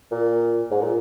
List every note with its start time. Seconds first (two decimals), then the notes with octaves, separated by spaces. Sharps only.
0.11 A#2
0.71 G#2
0.82 A#2